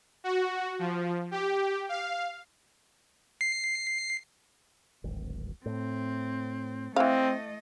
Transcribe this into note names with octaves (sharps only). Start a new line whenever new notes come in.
F#4
F3
G4
F5
C7
D1 G#1
A2 C4
E3 A3 C4 D#5 F5